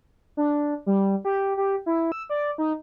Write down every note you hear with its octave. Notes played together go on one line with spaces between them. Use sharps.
D4
G3
G4
G4
E4
E6
D5
D#4